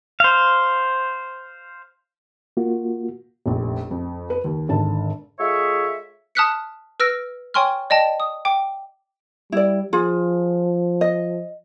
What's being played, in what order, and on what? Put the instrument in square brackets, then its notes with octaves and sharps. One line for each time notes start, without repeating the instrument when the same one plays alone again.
[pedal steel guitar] C5 F5
[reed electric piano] A#3 F4 F#4
[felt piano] F1 A#1
F2
B4
D#2
G#1 D3 A5
[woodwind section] G#3 F4 G#4 A4 C#5 E5
[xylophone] A5 D#6 F6 F#6 B6 C#7
B4 E6 F6 A#6 D7
C#5 G5 G#5 C6 C#6 F6
D5 D#5 G5 A5
D#6
G5 D6
[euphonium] G3 [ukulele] E4 D5
[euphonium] F3 [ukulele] F4 G#4
[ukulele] D#5